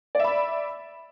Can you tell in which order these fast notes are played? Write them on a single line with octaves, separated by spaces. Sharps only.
D5 E5 B5